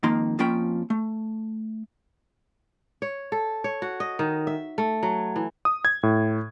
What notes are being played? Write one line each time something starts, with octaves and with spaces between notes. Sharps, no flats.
F2 G#2 D#3 A#3 D#4 C6
F2 F3 A#3 C#4 G5 B5
A3
C#5
A4
C#5
F#4
D#5
D#3
E5
A3
F#3
E3
D#6
G#6
A2